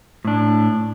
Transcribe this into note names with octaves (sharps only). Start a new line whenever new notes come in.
A2 D4